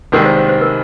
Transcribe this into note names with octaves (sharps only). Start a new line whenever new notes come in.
C2 C3 D#3 G#3 A#4
C5
C5
C5
A#4